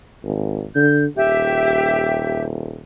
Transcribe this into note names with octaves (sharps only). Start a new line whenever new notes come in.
G#1
D3 G6
D#1 G4 E5